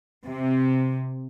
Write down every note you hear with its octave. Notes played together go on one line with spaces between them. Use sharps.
C3